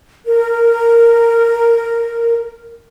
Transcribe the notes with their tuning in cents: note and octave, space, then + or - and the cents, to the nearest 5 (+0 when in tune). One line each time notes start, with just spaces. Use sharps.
A#4 -10